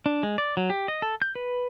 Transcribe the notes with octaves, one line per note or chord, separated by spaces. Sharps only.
D4
G#3
D5
F#3
G4
D#5
A4
G6
B4